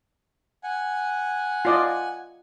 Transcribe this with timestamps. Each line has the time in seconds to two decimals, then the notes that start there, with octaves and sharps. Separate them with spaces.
0.63 F#5 G#5
1.65 F4 D5 D#5